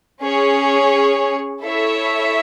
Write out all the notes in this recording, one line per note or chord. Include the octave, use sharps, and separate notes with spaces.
C#4 G#4 C#5
E4 A4 C#5 E5